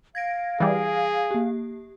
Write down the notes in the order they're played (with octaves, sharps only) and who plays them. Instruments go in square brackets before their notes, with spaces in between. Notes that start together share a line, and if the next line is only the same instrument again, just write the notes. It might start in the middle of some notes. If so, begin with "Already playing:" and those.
[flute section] F5 [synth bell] G#6 A#6 D7
[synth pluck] E3 G3 [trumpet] G#4
[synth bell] A#3 G4